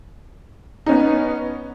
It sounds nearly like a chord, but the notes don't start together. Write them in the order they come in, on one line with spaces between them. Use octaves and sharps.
D#4 C#4 B3